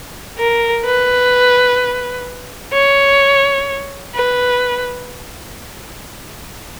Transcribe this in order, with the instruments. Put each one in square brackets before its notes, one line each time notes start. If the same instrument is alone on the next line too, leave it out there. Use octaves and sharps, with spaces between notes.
[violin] A#4
B4
C#5
B4